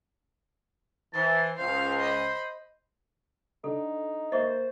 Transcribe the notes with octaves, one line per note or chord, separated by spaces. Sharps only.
E3 C5 A5
C#2 C5 F5
D#5 B5
D3 D#4 A4
A#3 C5 D#5 E5 C#6